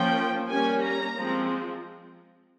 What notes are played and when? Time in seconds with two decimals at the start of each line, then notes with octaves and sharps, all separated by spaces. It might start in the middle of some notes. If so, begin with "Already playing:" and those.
Already playing: F3 A#3 C#4 G5
0.49 G3 A#3 C#4 G#5
0.83 A#5
1.16 F3 G#3 C4